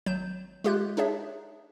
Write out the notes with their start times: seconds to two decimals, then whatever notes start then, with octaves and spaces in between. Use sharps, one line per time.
0.06 G#1 F#3 G6 E7
0.64 G#3 F4 G4 E5 F#6 G6
0.97 D4 D#4 G#4 C#5 E5